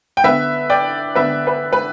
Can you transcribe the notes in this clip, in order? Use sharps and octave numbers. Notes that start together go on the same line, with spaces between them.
G5
D3 B3 B4 E5
D5 G5
D3 B3 B4 E5
B4
B4